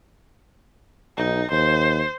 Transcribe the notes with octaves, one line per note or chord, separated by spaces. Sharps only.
B1 D#4
D#2 C5